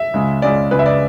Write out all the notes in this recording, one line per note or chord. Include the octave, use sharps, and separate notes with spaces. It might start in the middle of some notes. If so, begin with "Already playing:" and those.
Already playing: E5
C#2 C#3 G#3
C#2 C#3 G#3 D5
C#2 C#3 G#3 B4
E5
D5